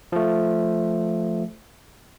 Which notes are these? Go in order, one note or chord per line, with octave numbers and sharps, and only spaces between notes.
F3 A3